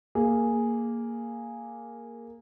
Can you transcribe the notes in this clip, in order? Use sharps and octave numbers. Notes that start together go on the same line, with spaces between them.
A#3 G#4